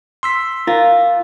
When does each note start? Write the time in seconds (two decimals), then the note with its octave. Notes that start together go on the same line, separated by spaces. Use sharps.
0.23 C6 E6 B6
0.67 F4 A#4